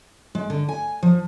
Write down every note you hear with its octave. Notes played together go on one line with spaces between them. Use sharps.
G#3
D3
G#5
F3